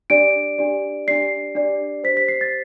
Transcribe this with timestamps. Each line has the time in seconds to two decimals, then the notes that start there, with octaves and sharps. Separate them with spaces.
0.10 D4 G4 D5 D7
0.58 D4 G4 D5
1.07 D4 G4 D5 C7
1.55 D4 G4 D5
2.04 G4 C5 B6
2.17 B6
2.28 C7
2.41 A6